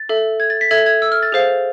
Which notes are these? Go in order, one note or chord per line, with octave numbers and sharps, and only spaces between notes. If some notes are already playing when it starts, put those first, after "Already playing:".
Already playing: A6
A4 E5
G#6
A6
B6
A4 E5 G#6
G#6
E6
F6
A6
G#4 C5 F5